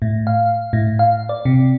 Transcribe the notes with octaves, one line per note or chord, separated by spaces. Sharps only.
A2
F5
A2
F5
D5
C3